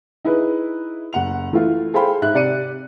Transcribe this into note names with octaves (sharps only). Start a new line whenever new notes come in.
D#4 E4 G#4 B4
F#1 F#5 F7
E3 A3 E4 F4
G#4 A4 C5 F5 G5 B5
G#2 E5 F#6
C3 G4 D5 C#7 D#7